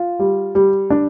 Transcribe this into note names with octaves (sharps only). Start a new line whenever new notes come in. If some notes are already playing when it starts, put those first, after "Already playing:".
Already playing: F4
G3
G3
D4